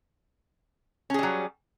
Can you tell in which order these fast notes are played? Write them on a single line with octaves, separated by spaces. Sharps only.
C#4 G#4 G3 F#3